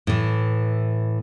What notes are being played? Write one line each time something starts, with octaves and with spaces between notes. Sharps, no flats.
A2 E3